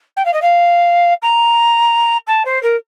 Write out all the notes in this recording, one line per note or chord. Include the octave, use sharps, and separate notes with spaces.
G5
F5
D#5
F5
A#5
A5
C5
A#4